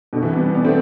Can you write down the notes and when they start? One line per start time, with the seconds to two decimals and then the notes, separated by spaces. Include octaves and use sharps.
0.13 B2 D3
0.23 C3 E3
0.33 G3 B3
0.54 B3 D4
0.65 A3 C4